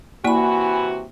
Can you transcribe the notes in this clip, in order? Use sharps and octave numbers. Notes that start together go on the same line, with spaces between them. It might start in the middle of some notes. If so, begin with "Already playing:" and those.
C3 E3 A#3 E4 F#4 D5 G#5 B5